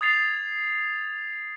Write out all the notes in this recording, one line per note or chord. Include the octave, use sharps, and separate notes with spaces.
D#6 G#6 A6 C7 F7